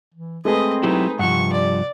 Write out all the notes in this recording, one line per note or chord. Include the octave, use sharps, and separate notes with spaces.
E3
G#3 A3 C4 G#4 B4 D#5
F#3 D#4 E4 G4 B4
G2 C3 F3 F#5 C#6
D5